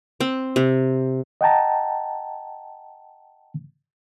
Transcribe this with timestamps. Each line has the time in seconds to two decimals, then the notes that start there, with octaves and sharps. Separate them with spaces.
0.20 C4
0.56 C3
1.41 D#5 F#5 G5 A5 A#5